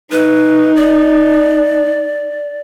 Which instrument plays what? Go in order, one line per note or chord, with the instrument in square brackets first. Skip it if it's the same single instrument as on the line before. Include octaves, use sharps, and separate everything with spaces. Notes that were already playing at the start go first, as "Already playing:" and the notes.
[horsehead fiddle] D#4 [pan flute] B4
[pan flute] D5